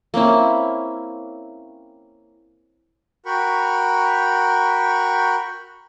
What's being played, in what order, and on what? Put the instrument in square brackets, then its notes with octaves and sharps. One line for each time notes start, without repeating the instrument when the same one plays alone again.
[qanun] A#3 C4 C#4 E4
[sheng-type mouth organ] F#4 A#4 G5 B5 C#6